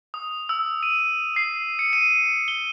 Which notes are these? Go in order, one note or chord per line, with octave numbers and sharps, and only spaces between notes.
D#6
E6
D#7
C7
C#7
D#7
G7